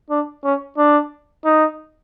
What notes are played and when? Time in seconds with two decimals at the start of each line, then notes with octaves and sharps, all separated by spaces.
0.10 D4
0.45 C#4
0.78 D4
1.45 D#4